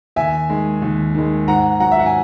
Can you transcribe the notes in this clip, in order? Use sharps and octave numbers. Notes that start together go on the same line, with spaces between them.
D#2 E5 G#5
D#3 G#3
D#2
D#3 G#3
G#2 F#5 A#5
F#3 F#5 A#5
E5
F#5
G#5